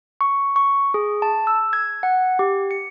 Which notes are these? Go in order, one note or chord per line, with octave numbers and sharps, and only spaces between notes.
C#6
C#6
G#4
A5
E6
G#6
F#5
G4
C#7